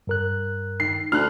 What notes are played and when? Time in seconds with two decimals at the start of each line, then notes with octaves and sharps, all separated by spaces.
0.07 G2 A#4 F#6
0.80 D#3 C7
1.12 D2 F6 F#6